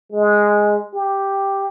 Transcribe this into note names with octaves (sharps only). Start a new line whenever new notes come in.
G#3
G4